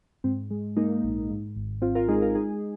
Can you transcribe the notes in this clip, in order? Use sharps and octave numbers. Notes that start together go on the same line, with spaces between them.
G#2 C4
G#3
G#3 A#3 D#4
A#1
G#2
G#1
G#1 C4 F4
F4 A#4
G#3 D#4 G#4
F4 A#4
G#3 D#4 G#4